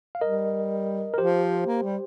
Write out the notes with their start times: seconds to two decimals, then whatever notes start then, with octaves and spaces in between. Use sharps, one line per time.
0.15 F5
0.21 G3 A#4 D#5
1.14 A#4
1.18 F3 G4 C5
1.66 A#3
1.83 G3